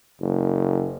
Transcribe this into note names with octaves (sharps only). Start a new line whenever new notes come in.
F#1